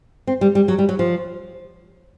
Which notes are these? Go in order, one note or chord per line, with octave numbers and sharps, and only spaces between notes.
C4
G3
G3
F#3
G3
F#3
F3